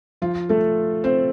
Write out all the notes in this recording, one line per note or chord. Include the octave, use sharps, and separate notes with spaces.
F3 F4
A3 A4
C4 C5